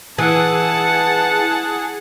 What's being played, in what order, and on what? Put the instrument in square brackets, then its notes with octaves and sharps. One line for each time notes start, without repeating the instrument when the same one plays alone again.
[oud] E3 [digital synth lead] G#4 [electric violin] F#5 A5